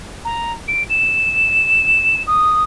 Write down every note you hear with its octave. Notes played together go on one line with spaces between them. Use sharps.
A#5
D7
E7
D#6